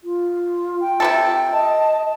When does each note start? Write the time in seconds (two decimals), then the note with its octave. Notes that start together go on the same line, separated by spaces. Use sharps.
0.04 F4
0.81 G5
1.00 C3 G3 A4
1.52 D#5 A5